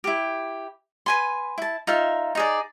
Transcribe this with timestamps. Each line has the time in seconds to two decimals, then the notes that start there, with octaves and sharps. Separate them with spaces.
0.04 E4 G4
1.06 B4 G#5 C6
1.58 E4 A5
1.87 D#4 F4 E5
2.35 D#4 G#4 D5